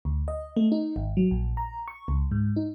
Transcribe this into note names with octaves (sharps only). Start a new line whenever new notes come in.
D2
D#5
A3
D#4
G#1
F#3
A#1
A#5
C#6
C#2
G#2
D#4